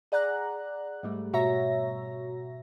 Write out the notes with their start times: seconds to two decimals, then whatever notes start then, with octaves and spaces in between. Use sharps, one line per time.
0.12 G#4 D5 F#5 A#5 F#6
1.03 G#2 G3 A3
1.33 B2 F#4 C#5 E5 A#5 A#6